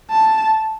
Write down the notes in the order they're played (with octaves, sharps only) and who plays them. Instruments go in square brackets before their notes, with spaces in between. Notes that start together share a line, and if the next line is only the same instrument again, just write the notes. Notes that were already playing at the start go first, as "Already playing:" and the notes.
[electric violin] A5